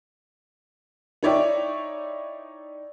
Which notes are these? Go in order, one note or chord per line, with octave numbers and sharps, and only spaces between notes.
D#4 E4 C#5 D5 E5 G5